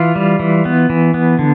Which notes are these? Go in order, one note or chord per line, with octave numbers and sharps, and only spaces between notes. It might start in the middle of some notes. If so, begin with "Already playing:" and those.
Already playing: E3 F4
G3
E3
B3
E3
B3
D3